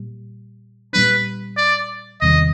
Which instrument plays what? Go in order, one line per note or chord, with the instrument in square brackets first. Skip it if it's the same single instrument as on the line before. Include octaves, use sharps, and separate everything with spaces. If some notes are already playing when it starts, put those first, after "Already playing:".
Already playing: [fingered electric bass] A#2 G3
[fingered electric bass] A#2 G3 B3 D4 [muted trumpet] B4
[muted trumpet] D5
[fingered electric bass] E2 C3 D#3 G3 [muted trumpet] D#5